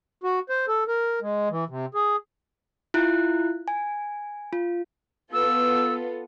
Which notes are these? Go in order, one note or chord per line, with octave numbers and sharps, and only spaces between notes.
F#4
C5
A4
A#4
G#3
E3
C3
G#4
E4 F4 F#6
G#5
F4
B3 F4 A4 E6